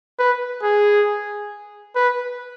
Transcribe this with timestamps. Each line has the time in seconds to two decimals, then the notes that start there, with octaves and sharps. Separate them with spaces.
0.19 B4
0.62 G#4
1.95 B4